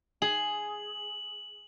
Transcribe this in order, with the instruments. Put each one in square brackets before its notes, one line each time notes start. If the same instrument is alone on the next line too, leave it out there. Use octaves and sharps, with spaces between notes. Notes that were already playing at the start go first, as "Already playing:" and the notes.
[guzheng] G#4 [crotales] F#7